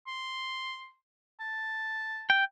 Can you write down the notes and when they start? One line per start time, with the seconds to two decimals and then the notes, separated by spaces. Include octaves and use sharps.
0.07 C6
1.40 A5
2.30 G5